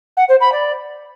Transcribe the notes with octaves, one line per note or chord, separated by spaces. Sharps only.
F#5
C5
B5
D5